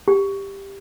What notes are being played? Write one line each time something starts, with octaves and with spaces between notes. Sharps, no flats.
G4